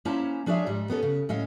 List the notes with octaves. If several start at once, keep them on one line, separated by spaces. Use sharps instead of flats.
A#3 C#4 E4 C5 A5 A#5
F3 D4 G#4 C#5 E5
G#2 G3
B3 C#4 A4
C#3
A2 C#4 D#5 F5